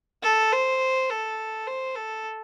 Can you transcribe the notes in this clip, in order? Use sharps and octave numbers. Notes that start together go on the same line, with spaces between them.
A4
C5
A4
C5
A4